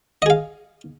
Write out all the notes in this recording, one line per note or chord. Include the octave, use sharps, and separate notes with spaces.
G#4 D#5 F5